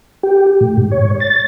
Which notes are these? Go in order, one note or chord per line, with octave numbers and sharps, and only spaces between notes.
G4
A2
G#2
C#5
A6